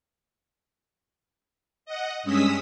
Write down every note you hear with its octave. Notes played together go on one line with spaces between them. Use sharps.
D#5 F#5
G2 G#3 C#4 D#6 E6 B6